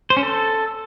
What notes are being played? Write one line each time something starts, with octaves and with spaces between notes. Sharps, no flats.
C5
C#4
A4